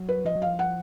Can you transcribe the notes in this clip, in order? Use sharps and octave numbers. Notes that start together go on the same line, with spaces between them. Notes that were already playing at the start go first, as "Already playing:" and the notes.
Already playing: F#3
B4
F3 D#5
F#3
F3 F5
F#5